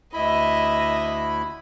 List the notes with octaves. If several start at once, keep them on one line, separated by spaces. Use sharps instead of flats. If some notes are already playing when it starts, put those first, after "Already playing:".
D2 E4 D#5 E5 B5